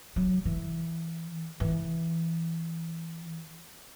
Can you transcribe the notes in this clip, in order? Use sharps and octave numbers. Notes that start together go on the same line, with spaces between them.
F#3
E3
E3